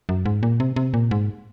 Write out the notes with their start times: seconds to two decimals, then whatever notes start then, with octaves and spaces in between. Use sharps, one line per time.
0.09 F#2
0.26 G#2
0.43 A#2
0.60 C3
0.76 C3
0.94 A#2
1.11 G#2